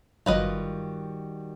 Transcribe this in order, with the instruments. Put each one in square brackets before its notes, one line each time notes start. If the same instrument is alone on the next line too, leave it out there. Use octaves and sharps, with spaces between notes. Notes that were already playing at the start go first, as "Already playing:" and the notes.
[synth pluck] G1 F#3 [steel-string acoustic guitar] D#3 G3 F#4 [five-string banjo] F4 B4 D#5